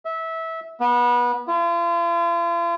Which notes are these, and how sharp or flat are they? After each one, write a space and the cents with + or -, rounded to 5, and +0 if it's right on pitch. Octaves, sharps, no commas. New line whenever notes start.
E5 -20
B3 -25
F4 -40